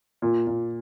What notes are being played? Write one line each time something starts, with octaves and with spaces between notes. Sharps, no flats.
A#2
A#2